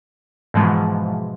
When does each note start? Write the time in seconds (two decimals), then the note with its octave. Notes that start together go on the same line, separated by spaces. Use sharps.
0.54 G#2 B2 E3 F3 G#3